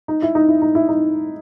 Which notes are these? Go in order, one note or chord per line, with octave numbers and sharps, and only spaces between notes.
D#4
E4
D#4
E4
D#4
E4
D#4